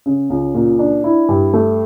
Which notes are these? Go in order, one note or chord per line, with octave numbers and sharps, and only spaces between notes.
C#3
C#2
A#2
D4
E4
G2
A3